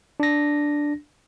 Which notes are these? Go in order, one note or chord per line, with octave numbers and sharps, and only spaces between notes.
D4 A#6